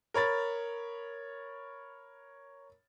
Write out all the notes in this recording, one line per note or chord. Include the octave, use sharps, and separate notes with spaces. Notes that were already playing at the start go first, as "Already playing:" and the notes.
A#4 C#5 B5 A6